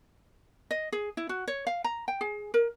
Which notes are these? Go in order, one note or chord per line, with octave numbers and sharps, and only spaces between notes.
D#5
G#4
E4
F#4
C#5
F5
A#5
G5
G#4
A#4